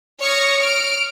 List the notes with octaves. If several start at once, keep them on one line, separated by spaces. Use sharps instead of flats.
C#5 C#6 D#6 F6 A#6
F6 D7